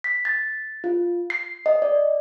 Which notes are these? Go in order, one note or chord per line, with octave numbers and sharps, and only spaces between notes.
B6
A6
F4
C7
D#5
D5